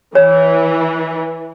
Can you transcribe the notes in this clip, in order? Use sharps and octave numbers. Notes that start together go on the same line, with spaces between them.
E3 C#5